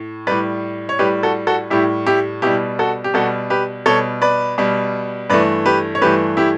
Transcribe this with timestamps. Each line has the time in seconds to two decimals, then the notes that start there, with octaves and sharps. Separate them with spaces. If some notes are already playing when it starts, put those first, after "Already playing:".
Already playing: A2
0.27 A2 G3 B4 D5
0.89 C#5
0.99 A2 G3 G4 B4
1.23 F#4 A4
1.47 F#4 A4
1.70 A2 G3 E4 G4
2.06 E4 G4
2.42 B2 G3 E4 G4
2.79 F#4 A4
3.04 G4
3.14 B2 G3 F#4 A4
3.50 G4 B4
3.86 B2 G3 A4 C#5
4.22 B4 D5
4.58 B2 G3
5.30 G2 E3 A3 B4 D5
5.66 G4 B4
5.95 C#5
6.02 G2 E3 A3 G4 B4
6.37 E4 G4